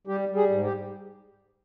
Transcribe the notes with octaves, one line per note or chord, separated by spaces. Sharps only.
G3 G4
G3
G#4
G#2
G4